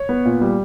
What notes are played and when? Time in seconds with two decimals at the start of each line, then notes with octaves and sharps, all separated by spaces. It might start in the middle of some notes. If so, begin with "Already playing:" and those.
Already playing: C#5
0.09 B3
0.25 A#2
0.41 G3